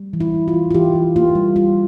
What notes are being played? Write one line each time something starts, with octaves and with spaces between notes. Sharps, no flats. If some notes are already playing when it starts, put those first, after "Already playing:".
Already playing: G3
E3
E4
E3
F4
E3
F4
E3 G4
E3
A#3 F4
G3
G3 F4